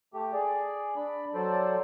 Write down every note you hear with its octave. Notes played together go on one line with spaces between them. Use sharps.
A3 G4
G#4 D5
D4 D5 B5
F#3 A4 C5 D5